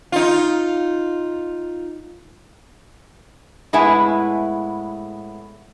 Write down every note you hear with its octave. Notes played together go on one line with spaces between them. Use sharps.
D#4 F4
A2 G#3 B3 E4 G#5